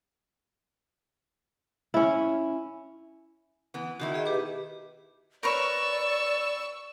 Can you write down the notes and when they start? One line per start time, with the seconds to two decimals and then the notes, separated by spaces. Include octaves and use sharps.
1.94 C#4 E4
3.74 E3 B3
4.00 B2 D#3 E4 F#4
4.14 G#4 D#5 E5
4.26 G4 B4 D6
5.43 A#4 B4 C#5 D5 C#6 E6